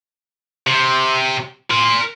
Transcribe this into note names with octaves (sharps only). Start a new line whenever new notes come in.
C3
A#4 C6